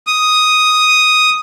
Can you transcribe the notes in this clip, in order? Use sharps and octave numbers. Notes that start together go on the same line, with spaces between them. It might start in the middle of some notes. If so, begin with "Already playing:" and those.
D#6